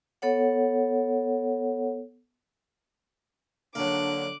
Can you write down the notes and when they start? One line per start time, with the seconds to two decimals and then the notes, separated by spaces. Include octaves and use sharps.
0.22 B3 A4 C#5 F#5
3.75 D3 F#3 A#3 D4 D6 F#6